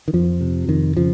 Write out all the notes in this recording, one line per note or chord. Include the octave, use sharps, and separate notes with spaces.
D#3
F2 F3
C3
F2 D#3
C#3 F3